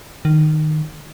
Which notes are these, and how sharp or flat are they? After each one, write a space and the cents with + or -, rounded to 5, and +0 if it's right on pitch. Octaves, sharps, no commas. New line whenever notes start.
D#3 -15